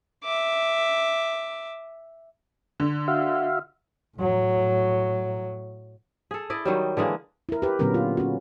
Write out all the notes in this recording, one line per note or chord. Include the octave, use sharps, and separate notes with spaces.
E5 D6
D3
F#4 E5 F5
A2 F#3
G#4 A4
E4 D5 D#5
D#3 F#3 G3
D3 E3 G#3 A#3
E4 A#4
G4 B4
A#2 D3 F#3 B3 C#4 A#4
F4
C#4 F#4